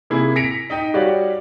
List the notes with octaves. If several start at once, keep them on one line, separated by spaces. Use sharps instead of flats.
C3 A#3 E4 G#4
A#6 B6 C#7 D7 F7
D#4 D#5 G5
G3 F#4 G4 C#5 D5 F5